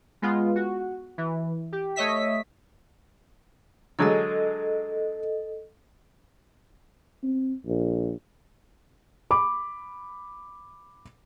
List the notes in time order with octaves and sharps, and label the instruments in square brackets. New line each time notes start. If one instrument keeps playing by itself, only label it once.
[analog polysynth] G#3 B3 F4
F#4
E3
G4
A3 C#5 D#5 E5 B6
[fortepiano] D3 F#3 G#3 [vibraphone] A4 D#5
[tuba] C4
A#1
[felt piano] B5 D6